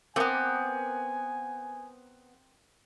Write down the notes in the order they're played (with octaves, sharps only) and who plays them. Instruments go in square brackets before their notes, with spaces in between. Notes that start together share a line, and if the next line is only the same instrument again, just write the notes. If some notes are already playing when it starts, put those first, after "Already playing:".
[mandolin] A3 B3 [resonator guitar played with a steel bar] C4 [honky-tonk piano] A#4 D6 [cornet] G#5